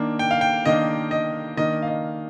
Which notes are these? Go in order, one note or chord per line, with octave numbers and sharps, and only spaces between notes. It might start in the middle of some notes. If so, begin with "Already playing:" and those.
Already playing: D#3 A#3 D4
G5
F5
G5
D#3 A#3 D4 D#5
D#5
D#3 A#3 D4 D#5
F5
D#5